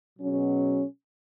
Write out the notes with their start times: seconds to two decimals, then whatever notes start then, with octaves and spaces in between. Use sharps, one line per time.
0.18 B2 F#3 C#4 G#4